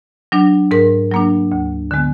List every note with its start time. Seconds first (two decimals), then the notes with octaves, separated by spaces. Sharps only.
0.32 F#3 D4
0.71 G#2 A#4
1.11 F#3 A#3 D4
1.52 D2
1.91 D3 G#3 B3